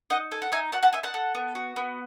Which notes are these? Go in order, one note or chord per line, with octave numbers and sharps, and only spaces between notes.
D#4 D#5 F#5
A4 G#5
F#5
D#4 E5 G#5
F#4 F#5 A5
F#5 A5
D#4 E5 G#5
F#5 A5
A4
B3
F#4
B3